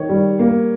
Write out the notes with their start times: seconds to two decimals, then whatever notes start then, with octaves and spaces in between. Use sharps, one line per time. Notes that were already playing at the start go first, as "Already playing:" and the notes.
Already playing: D#3 C#5
0.09 G3
0.39 A#3